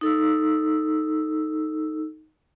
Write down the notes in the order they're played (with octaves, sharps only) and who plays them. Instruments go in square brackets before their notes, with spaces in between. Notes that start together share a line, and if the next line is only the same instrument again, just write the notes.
[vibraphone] D#4 A4 E6